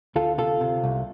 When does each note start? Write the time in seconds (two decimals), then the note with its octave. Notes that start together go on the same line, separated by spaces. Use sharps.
0.16 D2 F4 A4
0.38 C3 F4 A4
0.61 C3
0.84 C2